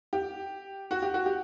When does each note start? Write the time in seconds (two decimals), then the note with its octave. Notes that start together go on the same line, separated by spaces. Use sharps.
0.13 G4
0.91 F#4
1.02 G4
1.14 F#4
1.26 G4